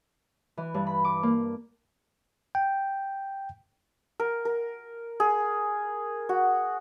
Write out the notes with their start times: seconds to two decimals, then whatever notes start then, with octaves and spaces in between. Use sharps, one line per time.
0.57 E3
0.74 G2
0.87 B5
1.05 D6
1.23 A#3
2.55 G5
4.20 A#4
4.45 A#4
5.20 G#4
6.29 F#4